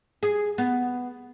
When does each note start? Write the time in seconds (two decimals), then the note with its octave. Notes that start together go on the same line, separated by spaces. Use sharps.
0.23 G#4
0.58 B3